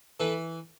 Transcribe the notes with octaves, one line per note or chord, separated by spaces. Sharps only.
E3 A4 B4